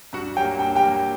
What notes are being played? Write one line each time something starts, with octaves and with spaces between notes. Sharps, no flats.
G2 F#4 F#5
F#3 A#3 G4 G5
G2 G5
G4 G5
F#3 A#3